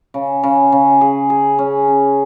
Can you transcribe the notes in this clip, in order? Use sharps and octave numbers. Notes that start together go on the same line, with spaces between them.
C#3
C#3
C#3
G#4
G#4
C#4
C#4